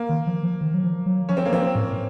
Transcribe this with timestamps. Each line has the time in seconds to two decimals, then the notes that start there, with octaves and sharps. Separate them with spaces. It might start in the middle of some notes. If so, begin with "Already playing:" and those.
Already playing: A#3
0.09 D#3
0.27 F3
0.43 F3
0.61 D#3
0.74 F#3
0.84 F3
1.06 F#3
1.29 F3 C#4
1.37 C4
1.45 A#3
1.52 F3 C4
1.62 C4
1.75 A2